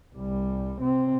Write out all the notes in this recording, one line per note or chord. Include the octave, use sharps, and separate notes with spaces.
C2 G3
C3 C4